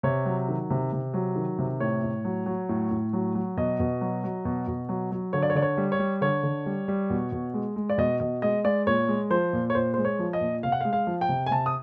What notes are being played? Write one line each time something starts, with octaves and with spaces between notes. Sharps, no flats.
C3 C#5
F#3
D#3
C3
C3
F#3
D#3
C3
A2 C#5
A2
F#3
F#3
A2
A2
F#3
F#3
B2 D#5
B2
F#3
F#3
B2
B2
F#3
F#3
D3 C#5
D5
C#5
D3 D5
C#5
G3
C#5
G3
D3 C#5
D3
G3
G3
B2
B2
G#3
G#3
D5
B2 D#5
B2 D#5
G#3 D#5
G#3 D5
A#2 C#5
G#3
F3 C5
A#2
C#5
A#2 C5
G#3 C5
C#5
F3
D#5
A#2
C3 F5
F#5
F5
G#3
F5
F3
G5
C3
G#5
C3 A5
D#6